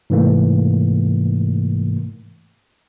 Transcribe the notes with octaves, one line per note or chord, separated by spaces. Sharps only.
G#2 C3 E3 A3 A#3